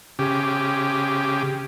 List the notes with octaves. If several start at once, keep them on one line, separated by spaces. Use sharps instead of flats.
C#3 G4